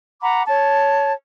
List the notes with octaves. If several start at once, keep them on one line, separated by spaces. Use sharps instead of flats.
F#5 A#5 B5 D6
C#5 A5